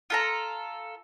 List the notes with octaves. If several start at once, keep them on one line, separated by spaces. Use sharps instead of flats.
F4 A4 A#5